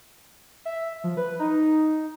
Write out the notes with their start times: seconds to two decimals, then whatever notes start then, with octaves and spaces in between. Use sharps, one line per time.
0.65 E5
1.04 F3
1.17 B4
1.39 D#4